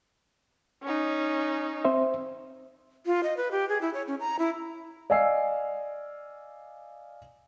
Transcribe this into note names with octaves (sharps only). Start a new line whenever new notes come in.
C#4 D#4
C4 C5 E5
F4
D#5
B4
G4
G#4
E4
C#5
C#4
A#5
E4
D5 D#5 F5 G#5 E6 C7